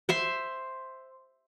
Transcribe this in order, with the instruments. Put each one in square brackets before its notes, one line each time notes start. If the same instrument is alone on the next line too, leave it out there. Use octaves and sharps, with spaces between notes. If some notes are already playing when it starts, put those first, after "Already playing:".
[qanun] C5 E5 C6